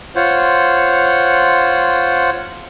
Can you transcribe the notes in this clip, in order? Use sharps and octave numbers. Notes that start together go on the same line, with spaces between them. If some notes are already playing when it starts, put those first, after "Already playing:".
F4 C5 C#5 F#5